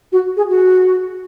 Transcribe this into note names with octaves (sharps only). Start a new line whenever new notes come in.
F#4
G#4
F#4